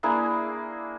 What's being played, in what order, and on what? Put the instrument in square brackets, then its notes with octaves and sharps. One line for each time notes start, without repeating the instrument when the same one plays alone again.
[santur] A#3 D4 E4 G#4